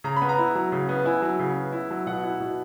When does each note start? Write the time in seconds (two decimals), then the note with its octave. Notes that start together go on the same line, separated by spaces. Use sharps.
0.04 C#3 A#5
0.16 B5
0.22 B3
0.29 A#5
0.39 E4
0.55 F#3
0.72 C#3
0.89 B3
1.05 E4 G#5
1.22 F#3
1.39 C#3
1.56 B3
1.73 E4
1.91 F#3
2.07 B2 F#5
2.23 E4
2.40 B2